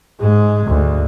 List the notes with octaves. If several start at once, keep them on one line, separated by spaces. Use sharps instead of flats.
G#2 G#3
D2